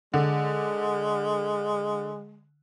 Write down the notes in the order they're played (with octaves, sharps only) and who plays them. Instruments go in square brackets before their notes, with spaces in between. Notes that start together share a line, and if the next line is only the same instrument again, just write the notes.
[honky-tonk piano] D3 [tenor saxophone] G#3